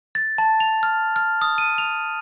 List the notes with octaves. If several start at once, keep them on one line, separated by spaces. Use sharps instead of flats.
A6
A5
F7
F6
F6
D#6
D#7
F7